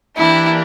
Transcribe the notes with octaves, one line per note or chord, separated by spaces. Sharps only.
E3 A#3 D4 E4 G4